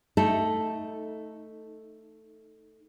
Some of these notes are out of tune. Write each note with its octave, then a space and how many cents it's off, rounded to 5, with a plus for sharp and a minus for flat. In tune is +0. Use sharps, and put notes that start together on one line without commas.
A3 +5 D#4 +20 A4 +0